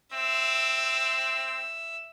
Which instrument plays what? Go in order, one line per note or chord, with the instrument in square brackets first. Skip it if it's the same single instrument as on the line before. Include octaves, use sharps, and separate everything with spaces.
[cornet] C4 [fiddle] E5